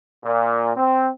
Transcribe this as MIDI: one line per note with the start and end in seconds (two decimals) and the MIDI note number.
0.24 0.70 46
0.77 1.08 60